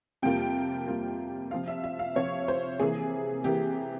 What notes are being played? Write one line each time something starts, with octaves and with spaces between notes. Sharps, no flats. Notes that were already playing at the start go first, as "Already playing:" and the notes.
F2 C3 G3 A#3 F4 G5
F2 C3 G3 A#3 F4
C3 F3 C4 F4 F5
E5
E5
F5
C3 F3 C4 F4 C#5
C5
C3 E3 A#3 G#4
C3 E3 A#3 G4